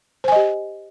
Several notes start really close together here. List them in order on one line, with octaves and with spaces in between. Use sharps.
C5 G#5 D#5 G4